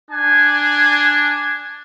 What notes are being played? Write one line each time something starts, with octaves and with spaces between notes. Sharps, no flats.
D4 G#5